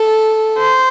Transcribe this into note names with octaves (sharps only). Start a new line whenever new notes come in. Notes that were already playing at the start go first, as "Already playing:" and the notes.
Already playing: A4
C5